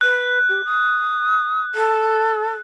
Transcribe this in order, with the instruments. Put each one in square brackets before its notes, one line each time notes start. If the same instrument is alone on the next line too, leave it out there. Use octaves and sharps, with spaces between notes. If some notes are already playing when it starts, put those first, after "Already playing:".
[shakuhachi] B4 [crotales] F#6
[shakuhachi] G4
D#6
A4